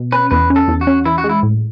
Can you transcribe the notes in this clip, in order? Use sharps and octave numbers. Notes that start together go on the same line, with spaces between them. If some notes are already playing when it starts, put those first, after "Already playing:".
Already playing: B2
C#4 B4
E2 B4
C#4
A4
E2
F#4
C#4
E3 E4
F#4
G#3
E4
A2